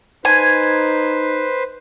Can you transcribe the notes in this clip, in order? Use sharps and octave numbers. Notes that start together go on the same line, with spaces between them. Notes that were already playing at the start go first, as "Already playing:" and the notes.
D#4 B4 C5 G#5